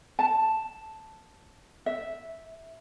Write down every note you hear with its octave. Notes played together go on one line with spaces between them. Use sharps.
A5
E5